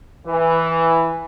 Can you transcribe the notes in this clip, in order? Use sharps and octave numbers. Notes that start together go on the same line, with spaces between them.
E3